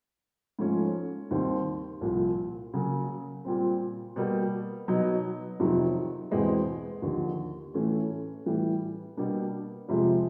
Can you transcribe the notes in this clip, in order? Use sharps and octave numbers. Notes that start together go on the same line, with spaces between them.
G#2 F3 A3 C#4
D#2 D#3 G3 C4
C2 A#2 F3
C#3 F#3 A#3
A#2 G3 C4
B2 G3 A#3
B2 F#3 B3 D#4
F2 C3 D#3 F#3
E2 B2 G#3 C4
D#2 D3 F3
A2 E3 A3 C#4
A2 E3 G3
B2 G3 A#3 D4
F2 C3 F3 G#3